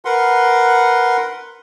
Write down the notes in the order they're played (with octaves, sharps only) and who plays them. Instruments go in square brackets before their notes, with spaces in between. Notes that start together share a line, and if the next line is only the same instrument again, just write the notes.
[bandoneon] A#4 B4 F#5 C6